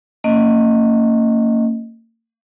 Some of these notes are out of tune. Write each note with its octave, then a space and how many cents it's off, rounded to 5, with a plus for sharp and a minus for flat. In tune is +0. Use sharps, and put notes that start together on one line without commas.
A#3 -40 C#4 +0 D#5 +5